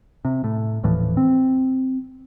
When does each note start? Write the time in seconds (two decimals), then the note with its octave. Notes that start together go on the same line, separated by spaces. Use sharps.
0.25 C3
0.44 A2
0.83 D#1 A2 E3 F3
1.17 C4